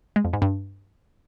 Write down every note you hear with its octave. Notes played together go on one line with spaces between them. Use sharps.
G#3
F2
G#2
G2